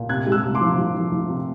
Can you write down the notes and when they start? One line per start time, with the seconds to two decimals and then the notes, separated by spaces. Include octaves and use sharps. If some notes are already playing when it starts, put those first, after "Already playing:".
Already playing: A#2
0.09 C3 F#6 G#6
0.26 G#3
0.32 E6 F#6
0.43 C3
0.55 C6 D6
0.61 F3
0.78 F3
0.95 F3
1.12 F3
1.29 C3